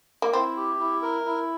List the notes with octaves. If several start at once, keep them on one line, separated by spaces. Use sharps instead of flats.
A#3
C4 E4
G4
E4
A#4
E4